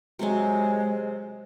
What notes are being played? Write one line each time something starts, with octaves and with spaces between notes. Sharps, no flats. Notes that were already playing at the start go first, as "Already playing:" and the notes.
C3 F#3 G#3 C4